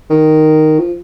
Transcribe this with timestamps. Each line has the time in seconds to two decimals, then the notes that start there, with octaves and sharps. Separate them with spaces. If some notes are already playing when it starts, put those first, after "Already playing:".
0.10 D#3
0.79 F3